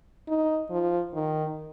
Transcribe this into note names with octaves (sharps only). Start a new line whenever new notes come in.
D#4
F3
D#3